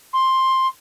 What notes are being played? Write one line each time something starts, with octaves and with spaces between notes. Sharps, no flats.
C6